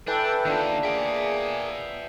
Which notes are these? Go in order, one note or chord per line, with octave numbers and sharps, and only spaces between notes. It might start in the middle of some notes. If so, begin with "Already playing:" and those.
E3 D4 A4 B4 G5 A5
D#3 A#3 B3 D4 F4
A#3 G#4 E5 G5